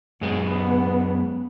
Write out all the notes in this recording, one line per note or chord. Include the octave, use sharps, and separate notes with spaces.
F#2 G#3 B3